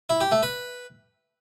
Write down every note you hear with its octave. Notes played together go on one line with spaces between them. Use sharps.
E4
G4
A3
B4